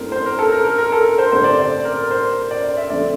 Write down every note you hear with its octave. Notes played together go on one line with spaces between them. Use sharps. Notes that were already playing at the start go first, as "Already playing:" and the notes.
Already playing: G2 E3 A3 C4 A#4
C5
A#4
A4
A#4
A#4
A#4
A4
A#4
C5
G2 D3 A3 C4 C5
D5
D5
A#4
A#4
C5
D5
D5
E5
F2 D3 A3 C4 D5